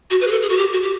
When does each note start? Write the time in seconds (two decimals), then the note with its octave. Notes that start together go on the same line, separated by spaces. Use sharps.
0.11 F#4
0.21 B4
0.27 G#4
0.32 A4
0.42 G#4
0.50 F#4
0.58 G4
0.73 F#4
0.83 G4